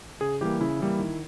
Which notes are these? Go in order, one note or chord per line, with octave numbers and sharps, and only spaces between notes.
C#3 G#4
E3 G3 A#3 G4
C#3 E4
E3 G3 A#3
D#3